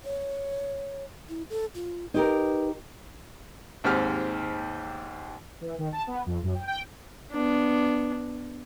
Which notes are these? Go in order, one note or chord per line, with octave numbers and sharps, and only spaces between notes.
C#5
E4
A4
F4
D#4 G4 A#4 B4
D#2 G#2 C4 G4 F6
E3
D#3
A5
B3
F2
F#2
G5
G5
B3 D4